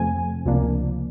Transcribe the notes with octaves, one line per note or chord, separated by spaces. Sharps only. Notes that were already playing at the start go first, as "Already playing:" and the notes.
Already playing: F2 C3 F3 A3 C4 G#5
C#2 C3 F3 A#3 D4